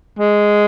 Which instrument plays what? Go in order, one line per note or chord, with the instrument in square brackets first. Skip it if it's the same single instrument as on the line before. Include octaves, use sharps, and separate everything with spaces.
[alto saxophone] G#3